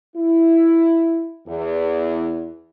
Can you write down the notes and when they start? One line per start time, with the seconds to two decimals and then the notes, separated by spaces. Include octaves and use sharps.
0.16 E4
1.48 E2